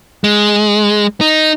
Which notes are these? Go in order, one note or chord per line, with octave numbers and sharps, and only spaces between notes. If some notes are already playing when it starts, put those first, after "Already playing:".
G#3
D#4